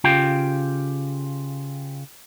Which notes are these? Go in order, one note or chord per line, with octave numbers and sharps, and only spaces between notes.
C#3 F4 G4 G5